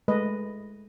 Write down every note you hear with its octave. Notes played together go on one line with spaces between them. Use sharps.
G#3 A3 B4 D#5